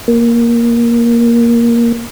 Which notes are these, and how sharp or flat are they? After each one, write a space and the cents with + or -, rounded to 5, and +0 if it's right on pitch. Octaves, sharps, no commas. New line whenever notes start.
A#3 +10